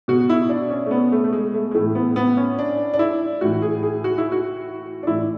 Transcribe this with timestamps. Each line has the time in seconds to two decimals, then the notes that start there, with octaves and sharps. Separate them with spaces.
0.08 B2 F#4
0.30 E4
0.49 D4
0.70 C#4
0.86 A3
0.91 B3
1.12 A3
1.24 A3
1.33 G#3
1.54 A3
1.71 G#3
1.75 A2 E3 A3
1.95 B3
2.16 B3
2.37 C#4
2.59 D4
2.93 D4
2.99 E4
3.41 A2 E3 F#4
3.62 G#4
3.83 G#4
4.04 F#4
4.18 E4
4.32 F#4
5.03 D4
5.07 A2 E3 E4